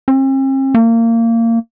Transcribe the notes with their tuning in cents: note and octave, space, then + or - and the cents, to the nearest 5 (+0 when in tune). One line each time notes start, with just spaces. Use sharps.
C4 +45
A#3 -25